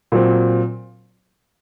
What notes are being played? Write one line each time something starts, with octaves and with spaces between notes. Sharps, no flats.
A#2 F#3 C4